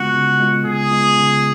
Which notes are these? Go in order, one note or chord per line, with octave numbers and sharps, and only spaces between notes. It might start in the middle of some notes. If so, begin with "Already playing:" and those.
Already playing: C#3 G#3 B3 F4 F#4
C#3
G#3 B3 F4
C#3 G#4
G#3 B3 F4
C#3